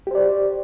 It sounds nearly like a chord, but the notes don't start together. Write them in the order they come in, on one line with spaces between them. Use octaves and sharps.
G4 C5 D5